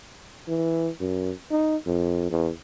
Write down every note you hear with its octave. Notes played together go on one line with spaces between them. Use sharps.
E3
F#2
D#4
F2
E2